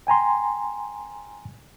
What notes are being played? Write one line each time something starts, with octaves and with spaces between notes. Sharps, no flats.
G5 G#5 A#5 C6